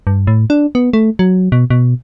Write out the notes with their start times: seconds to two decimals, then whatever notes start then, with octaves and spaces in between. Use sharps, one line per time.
0.07 G2
0.27 A2
0.50 D4
0.75 B3
0.93 A3
1.19 F#3
1.52 B2
1.70 B2